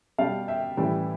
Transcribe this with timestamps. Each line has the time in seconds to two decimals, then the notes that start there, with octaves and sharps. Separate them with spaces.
0.18 B2 G3 F5 A5
0.48 E5 G5
0.77 A2 E3 G3